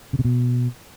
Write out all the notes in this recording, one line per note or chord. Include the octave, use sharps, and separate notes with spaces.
C#3
C3
B2